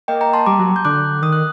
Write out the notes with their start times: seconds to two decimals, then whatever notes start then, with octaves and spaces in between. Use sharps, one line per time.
0.08 A#3 D#5 G5
0.21 G5 A#5
0.33 A5 C6
0.46 G3 A#5 D6
0.59 F#3
0.76 G6
0.85 D3 D6 F#6
1.22 D#3 D#6
1.32 F#6